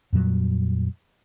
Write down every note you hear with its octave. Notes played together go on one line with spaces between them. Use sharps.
F2 A#2 F#3 G3